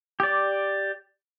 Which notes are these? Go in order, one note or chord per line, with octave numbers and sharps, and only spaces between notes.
G4 D5